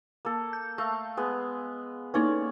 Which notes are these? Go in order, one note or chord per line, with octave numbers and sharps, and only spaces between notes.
A#3 A4
G6
A3 F5 E6
G#3 B3
A#3 C#4 D#4 B4 C#5 D5